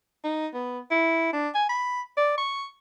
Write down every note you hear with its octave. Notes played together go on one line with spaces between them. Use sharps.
D#4
B3
E4
D4
G#5
B5
D5
C#6